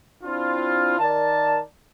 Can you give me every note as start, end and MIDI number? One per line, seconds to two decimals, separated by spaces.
0.24 0.97 60
0.24 0.97 62
0.24 0.97 64
0.24 0.97 65
0.99 1.59 51
0.99 1.59 70
0.99 1.59 74
0.99 1.59 81